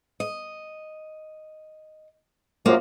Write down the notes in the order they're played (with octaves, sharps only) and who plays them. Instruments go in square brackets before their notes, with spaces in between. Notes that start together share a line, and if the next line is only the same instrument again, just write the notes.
[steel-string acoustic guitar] D#5
[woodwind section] F#2 C3 F3 [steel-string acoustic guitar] A#3